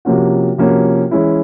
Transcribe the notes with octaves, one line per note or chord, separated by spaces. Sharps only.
C3 F3 A#3 C#4 F#4
C3 F3 A#3 C#4 F#4
E3 G#3 C#4 E4